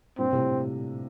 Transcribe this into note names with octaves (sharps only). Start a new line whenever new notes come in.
G2 A#2 C4
A2 C3